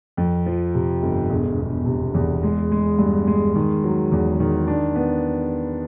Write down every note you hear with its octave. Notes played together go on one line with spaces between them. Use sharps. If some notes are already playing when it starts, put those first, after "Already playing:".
F2
F3
C3
G1
E1
E1
C3
E2
G#3
G#3
G2
G#3
D#3
F#3
E2
D#3
D4
B3